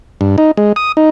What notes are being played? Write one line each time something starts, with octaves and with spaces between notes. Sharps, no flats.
G2
D#4
G#3
D#6
D#4